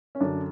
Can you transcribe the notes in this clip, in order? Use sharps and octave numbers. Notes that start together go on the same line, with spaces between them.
C#4
F#2 D3 D4